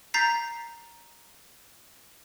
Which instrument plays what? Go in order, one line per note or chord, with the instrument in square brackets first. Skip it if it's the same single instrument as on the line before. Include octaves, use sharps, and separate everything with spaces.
[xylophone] A#5 G6 A6 B6 C7